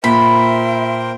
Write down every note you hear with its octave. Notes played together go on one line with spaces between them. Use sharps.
A#2 A#4 C5 E5 G5 B5